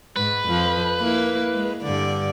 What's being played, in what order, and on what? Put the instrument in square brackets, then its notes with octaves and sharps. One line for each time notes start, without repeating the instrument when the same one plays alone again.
[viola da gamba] G#2 [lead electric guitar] B4
[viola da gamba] F2 F3
A#3 E4
G#3
G2 D3 D5